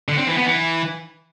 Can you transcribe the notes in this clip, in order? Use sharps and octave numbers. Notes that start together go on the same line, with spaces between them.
D3
C4
E3
B3
E3